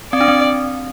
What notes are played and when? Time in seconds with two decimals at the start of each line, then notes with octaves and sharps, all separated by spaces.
0.13 C4 D5
0.21 D4
0.28 C4